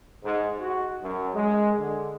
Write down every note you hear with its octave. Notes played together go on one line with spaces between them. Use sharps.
G#2
F#4
F#2
G#3
D3